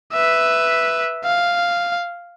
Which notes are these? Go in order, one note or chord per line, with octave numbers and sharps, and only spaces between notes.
B4 E5
F5